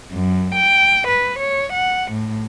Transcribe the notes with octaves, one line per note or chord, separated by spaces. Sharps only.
F#2
G5
B4
C#5
F#5
A2